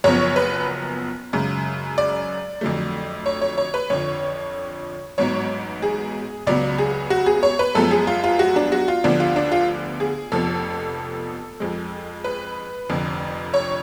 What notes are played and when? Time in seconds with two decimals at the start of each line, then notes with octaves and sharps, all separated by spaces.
0.04 F#1 F#2 F3 B3 C#5
0.36 B4
1.33 F#2 C#3 G#3
1.98 D5
2.61 F2 D3 F#3 A3
3.26 C#5
3.41 C#5
3.57 C#5
3.74 B4
3.90 F2 D3 F3 C#5
5.18 A1 G#2 F#3 B3 C#5
5.82 G#4
6.47 C#2 C#3 F#3 B3 D5
6.78 G#4
7.10 F#4
7.26 G#4
7.43 C#5
7.59 B4
7.75 F#2 F3 G#3 B3 A4
7.91 G#4
8.07 F4
8.24 F4
8.39 F#4
8.56 D4
8.72 F#4
8.88 F4
9.04 D2 D3 F3 B3 D4
9.20 F4
9.36 D4
9.52 F4
10.00 G#4
10.32 F1 F2 F3 B3 A4
11.60 F2 F3 G#3
12.24 B4
12.89 F1 F2 D3 F3
13.54 C#5